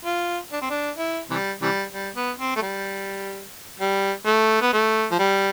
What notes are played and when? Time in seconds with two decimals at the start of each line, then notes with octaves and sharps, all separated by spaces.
0.05 F4
0.52 D4
0.61 C4
0.70 D4
0.98 E4
1.30 C3 E3 G3
1.61 C3 E3 G3
1.92 G3
2.15 B3
2.39 C4
2.56 A3
2.62 G3
3.79 G3
4.26 A3
4.61 B3
4.73 A3
5.11 F3
5.19 G3